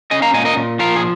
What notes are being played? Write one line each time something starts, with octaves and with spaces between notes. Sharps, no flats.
C#4 D#5 G#5
F5 A#5
A#2 D#5 G#5
A#4 D#5
A#2
F3 F4 A#4
G#4